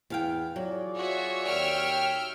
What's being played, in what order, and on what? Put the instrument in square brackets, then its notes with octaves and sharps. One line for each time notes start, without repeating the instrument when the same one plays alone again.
[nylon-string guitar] E2 F5 G5
[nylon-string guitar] F#3 [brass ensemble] F4 G#4 D5
[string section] F#4 [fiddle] C#5 E5
[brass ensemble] D#2 [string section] G5 E6 F6